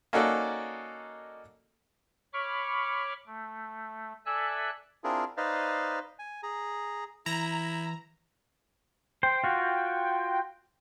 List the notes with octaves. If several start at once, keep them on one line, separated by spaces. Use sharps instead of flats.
A#3 C#4 D#4 F#4 A4 D5
C#5 B5 C#6 D6 F6
A3
A4 D5 E5 G#5 E6 F#6
C4 D4 E4 F4 G#4 A#4
D#4 B4 C5 D5 D#5 F5
G#5
G#4 A#5
E3 E4 A#5
C5 G5
F4 F#4